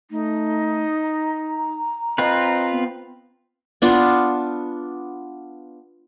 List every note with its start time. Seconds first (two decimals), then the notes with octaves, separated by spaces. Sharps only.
0.11 A3 D#4
1.01 A#5
2.18 C4 F4 B4 D#5
2.72 B3
3.82 B3 D4 F4